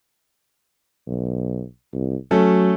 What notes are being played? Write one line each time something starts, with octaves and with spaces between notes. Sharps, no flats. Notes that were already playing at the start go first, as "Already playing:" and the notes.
B1
C2
F#3 A3 C#4 A4